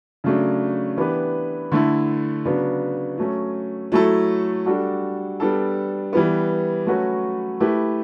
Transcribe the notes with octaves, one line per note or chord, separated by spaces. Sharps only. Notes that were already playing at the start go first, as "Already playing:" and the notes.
C#3 F#3 A3 D4
E3 B3 D4 G4 B4
D3 A3 E4
C#3 F#3 B3 D4
F#3 A3 C#4
F#3 A3 E4 A4
G3 D4 F#4 A4
G3 B3 D4 A4
E3 G3 B3
F#3 A3 C#4 F#4 B4
A3 E4 G4 B4